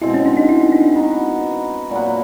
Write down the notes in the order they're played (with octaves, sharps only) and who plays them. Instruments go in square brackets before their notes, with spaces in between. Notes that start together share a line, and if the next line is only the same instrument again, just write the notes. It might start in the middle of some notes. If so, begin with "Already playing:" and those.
[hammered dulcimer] B2 G#3 C4 [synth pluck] E4
[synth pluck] C#4
D4
D#4
E4
D4
[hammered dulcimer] B3 D#4 F#4
A#2 F#3 B3